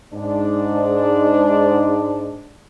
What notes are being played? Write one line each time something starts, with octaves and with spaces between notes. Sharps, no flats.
G#2 D4